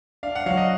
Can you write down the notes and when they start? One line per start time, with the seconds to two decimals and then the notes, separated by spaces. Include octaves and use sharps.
0.23 D4 F5
0.36 F#5
0.46 F#3 F5
0.57 D#5